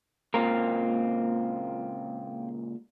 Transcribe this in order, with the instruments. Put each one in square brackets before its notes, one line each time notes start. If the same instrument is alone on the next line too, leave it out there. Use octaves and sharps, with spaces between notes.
[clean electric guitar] C#2 A#2 A#4 [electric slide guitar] A#3 C4